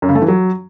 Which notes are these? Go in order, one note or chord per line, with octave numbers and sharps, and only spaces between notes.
F#2
C#3
A3
E3
F#3